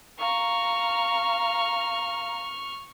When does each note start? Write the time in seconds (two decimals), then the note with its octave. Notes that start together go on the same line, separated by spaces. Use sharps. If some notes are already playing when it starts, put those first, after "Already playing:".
0.19 F5 A#5 C#6 F6